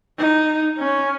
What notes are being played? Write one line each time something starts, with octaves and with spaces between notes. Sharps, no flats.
D#4
C#4